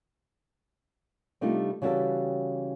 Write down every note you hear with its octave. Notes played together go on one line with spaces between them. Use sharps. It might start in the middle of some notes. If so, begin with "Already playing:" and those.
C3 G3 A3 D4 D#4 F4
C#3 E3 G3 F#4 G4 A4